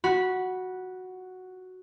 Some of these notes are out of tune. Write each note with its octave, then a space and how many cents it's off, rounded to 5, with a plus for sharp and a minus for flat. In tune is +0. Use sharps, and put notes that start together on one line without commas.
F#4 +0 B5 -15